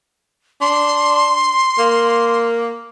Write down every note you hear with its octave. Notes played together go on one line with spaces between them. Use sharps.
D4 C6
A#3